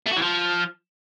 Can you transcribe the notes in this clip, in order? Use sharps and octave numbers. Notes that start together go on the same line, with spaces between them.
A3
F#4
E3
F3